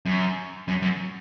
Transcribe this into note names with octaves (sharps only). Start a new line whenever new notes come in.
F#2
F#2
F#2